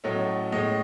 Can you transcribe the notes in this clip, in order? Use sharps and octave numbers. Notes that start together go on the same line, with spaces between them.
A2 F#3 A3 C#4 D#5
A2 G#3 C#4 D#5